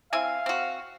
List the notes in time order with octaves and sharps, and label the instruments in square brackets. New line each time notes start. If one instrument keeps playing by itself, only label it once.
[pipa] C4 E4 G#5 [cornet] F5
[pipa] C4 F#4